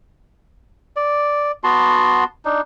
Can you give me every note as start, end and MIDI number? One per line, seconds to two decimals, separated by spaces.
0.96 1.51 74
1.64 2.24 59
1.64 2.24 66
1.64 2.24 81
1.64 2.24 84
2.45 2.61 62
2.45 2.61 63